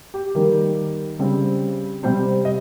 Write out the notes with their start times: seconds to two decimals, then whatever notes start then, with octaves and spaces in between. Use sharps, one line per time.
0.14 G4
0.35 D#3 G3 A#3
1.19 C#3 G3 C4
2.03 C3 G3 C4 C5
2.45 D#5